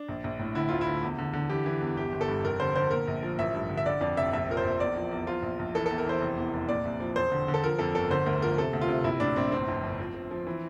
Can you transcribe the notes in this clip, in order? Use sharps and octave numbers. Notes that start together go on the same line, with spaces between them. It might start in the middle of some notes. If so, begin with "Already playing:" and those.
Already playing: D4
A#1
A#1
A2
D3 E4
D2 F4
E4
D3
E2
D3
D3
E3 G4
E3
E2
G1 G4
G1
A4
G2
F1 A#4
D3 C5
D3 C5
A#2 A#4
A#1
F3
A1 E5
G2
D3
E5
D3 D5
F2 D5
F1 E5
A#1 E5
F3 A#4
C5
A#1
E2 D5
F3
E2
F3 F4
A#1
A#1
E3 A4
A4
E2
A#4
E3 C5
F1
E2
F1
A#2 D5
C2
F3
E1 C5
D3
D3
A4
F3 A#4
F2 A4
G1 A4
D3 C5
D2 A#4
F3 A#4
C3 A4
D2
F4
C3
A#1 E4
A2 D4
A#1 C4
G1 C4
F2
G1
F3
F3
F3
E3